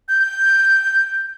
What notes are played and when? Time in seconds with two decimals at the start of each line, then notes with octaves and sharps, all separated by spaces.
0.09 G6